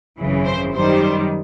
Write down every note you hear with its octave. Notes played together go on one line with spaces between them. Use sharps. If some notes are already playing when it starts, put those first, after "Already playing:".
G#1 F#2 C#3 E3
C5
F#2 D#3 G3 C5